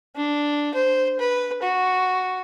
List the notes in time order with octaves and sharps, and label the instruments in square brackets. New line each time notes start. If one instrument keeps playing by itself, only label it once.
[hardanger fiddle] D4
C5
B4
F#4